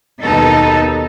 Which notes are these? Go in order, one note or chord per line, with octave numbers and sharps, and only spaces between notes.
D#2 B2 B3 D#4 A4